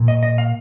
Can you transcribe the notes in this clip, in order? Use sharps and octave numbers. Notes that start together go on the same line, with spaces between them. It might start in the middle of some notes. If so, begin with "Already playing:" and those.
Already playing: A#2
D#5
D#5
F5